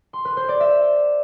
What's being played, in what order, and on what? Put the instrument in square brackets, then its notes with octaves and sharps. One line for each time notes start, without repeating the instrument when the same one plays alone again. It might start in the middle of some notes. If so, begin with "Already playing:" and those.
[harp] C6
B4
C5
D5
E5